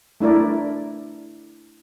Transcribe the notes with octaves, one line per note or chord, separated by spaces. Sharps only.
A3 D4 E4 A#4 D5